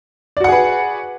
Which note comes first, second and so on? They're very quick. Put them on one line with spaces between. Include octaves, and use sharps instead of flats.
D5 F#4 F#5 G#4 B4